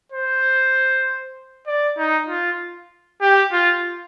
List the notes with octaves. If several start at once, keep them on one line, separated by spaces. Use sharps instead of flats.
C5
D5
D#4
F4
G4
F4